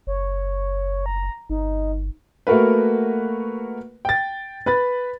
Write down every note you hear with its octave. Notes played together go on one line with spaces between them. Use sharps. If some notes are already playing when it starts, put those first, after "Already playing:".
F#1 C#5
A#5
G1 D#4
A3 A#3 F#4 A#4 B4
G5 A6
B4 B5 A6